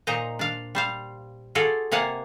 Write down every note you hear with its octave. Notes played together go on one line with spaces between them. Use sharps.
A#2 D#4 C5 D#5 A#5
D4 F5
G3 C5 F5
F4 F#4 G#4 A4 D5
C3 A#3 F5 F#5 G#5 A5